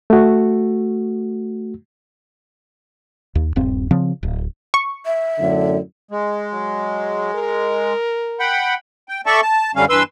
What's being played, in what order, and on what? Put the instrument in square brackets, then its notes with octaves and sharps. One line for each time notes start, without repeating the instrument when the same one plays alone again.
[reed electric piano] A3 F#4
[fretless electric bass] D#2
D#1 G2 C4
C#3 F3 C4
D1
[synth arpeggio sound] C#6
[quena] E5
[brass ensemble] F#2 A2 D3
[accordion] G#3
[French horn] F#3
A#4
[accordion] F#5 G5 B5
G5
A4 D5 E5 A5 C#6
A5
F#2 D3 G3 C#4 F5
G2 E3 B4 C6 E6